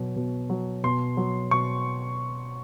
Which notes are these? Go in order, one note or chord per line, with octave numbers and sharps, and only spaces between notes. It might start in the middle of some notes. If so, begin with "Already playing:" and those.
Already playing: B2 F#3
B2
F#3
B2 C6
F#3
B2 C#6